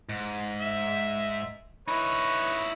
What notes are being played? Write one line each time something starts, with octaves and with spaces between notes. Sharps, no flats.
G#2
E5
D#4 E4 B4 C#5